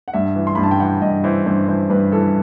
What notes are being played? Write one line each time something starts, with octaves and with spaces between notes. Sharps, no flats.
F#5
G2 E5
E3
C6
G2 B5
A5
G5
E3 F#5
G2 D#5
E3 C5
G2 C5
E3 C5
G2 B4
E3 A4